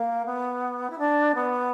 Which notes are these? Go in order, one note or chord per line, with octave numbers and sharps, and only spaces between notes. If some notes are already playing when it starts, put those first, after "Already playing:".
Already playing: A#3
B3
E4
D4
B3